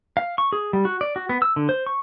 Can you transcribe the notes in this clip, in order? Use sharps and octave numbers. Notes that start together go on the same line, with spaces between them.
F5
C#6
G#4
G3
F#4
D5
F#4
B3
E6
D3
C5
C#6